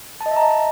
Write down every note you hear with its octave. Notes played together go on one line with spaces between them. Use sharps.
A5
D#5
E5
A#5
D#5